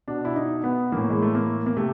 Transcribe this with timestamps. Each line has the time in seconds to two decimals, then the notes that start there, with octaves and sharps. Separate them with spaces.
0.08 B2 D4
0.25 E4
0.36 D#4
0.64 B3
0.92 A2 E3 A#3
1.10 G#3
1.22 A3
1.35 A#3
1.66 A#3
1.77 C3 A3